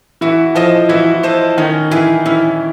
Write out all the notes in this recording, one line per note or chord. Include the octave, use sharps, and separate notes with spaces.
E3 E4 F#4
F3 F4 A4 C5 D#5
E3 E4 F#4
A4 C5 D#5
D#3 C#4 D#4
E3 E4 F4 G#4
E3 C#4 E4